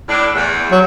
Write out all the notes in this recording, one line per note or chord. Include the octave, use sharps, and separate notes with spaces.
A2 D4
E2
F#3